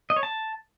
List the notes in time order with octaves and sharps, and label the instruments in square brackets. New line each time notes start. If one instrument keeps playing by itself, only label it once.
[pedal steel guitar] D#5
C#5
A5